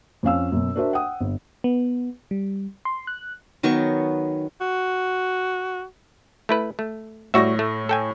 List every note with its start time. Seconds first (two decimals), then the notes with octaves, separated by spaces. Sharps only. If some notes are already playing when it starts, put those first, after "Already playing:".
0.23 F2 C#4 F5 E6
0.52 F#2 B2
0.75 D4 F#4 A#4 C5 E5
0.93 F#5 G5 D#6
1.20 G1
1.64 B3
2.31 G3
2.85 C6
3.07 F#6
3.63 D#3 F#3 B3 C#6
4.61 F#4
6.49 A3 E4 B4
6.79 A3
7.34 A2 G3 F#4 E5 C#6 A#6
7.59 A3
7.89 A4 G5 G#5